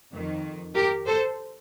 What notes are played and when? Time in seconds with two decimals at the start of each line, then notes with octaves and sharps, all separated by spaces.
0.12 F2 D#3
0.74 G4 A#4
1.06 A4 C5